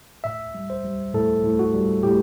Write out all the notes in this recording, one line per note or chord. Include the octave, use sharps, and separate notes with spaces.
A2 E5
G3
C5
G3
A2 A4
A2
F#4
G3
A2 G4